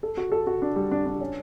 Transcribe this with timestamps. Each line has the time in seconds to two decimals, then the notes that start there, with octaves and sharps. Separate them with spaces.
0.03 A4
0.17 F#4
0.32 A4
0.47 F#4
0.62 D4
0.76 G3
0.91 D4
1.06 D4
1.21 C#4